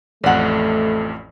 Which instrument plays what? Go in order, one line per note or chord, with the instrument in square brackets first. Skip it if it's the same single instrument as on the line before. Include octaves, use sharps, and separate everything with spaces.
[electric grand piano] A1 F2 [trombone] A3 [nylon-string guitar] D5 F#5